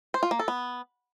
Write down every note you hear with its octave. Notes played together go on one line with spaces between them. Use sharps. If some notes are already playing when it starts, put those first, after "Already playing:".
C5
F4
A#3
A4
B3